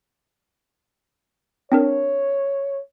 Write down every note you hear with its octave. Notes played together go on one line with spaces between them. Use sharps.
C4 D4 A#4 C#5